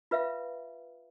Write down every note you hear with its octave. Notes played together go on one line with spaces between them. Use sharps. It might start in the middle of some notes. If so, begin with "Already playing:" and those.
F4 B4 E5 F5